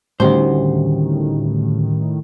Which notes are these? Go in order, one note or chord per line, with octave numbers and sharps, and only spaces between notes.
D2 A2 D#3 G3 C#4 G4 C5